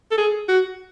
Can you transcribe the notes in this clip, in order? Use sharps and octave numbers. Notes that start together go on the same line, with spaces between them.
A4
G#4
F#4